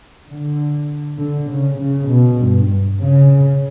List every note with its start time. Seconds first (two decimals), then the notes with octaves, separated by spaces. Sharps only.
0.29 D3
1.19 D3
1.50 C#3
1.79 C#3
2.09 B2
2.40 G2
3.00 C#3